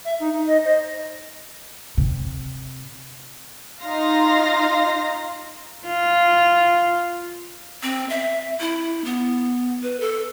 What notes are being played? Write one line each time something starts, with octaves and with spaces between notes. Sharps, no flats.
E5
D#4
D#4
D#5
C5 D#5
C3
D#4 F4 F5 C6 A#6
F4
C4
E5
E4
B3
B4
A4